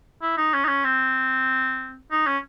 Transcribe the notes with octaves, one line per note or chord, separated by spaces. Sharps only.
E4
D#4
C#4
D#4
C#4
C4
D#4
C#4